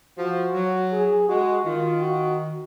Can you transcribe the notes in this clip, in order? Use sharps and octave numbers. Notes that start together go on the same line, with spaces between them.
F3 F#4
F#3
G#4
G#3 F#4
D#3 F4
F#4